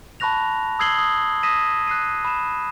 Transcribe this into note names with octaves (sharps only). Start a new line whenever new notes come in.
A5 B5 C#6 F#6 A#6 F7
D#6 E6 G#6 C7 F#7 G7
D#6
D#6 E6 A#6 B6 D#7 E7
F#6 C7 D#7
B5 E7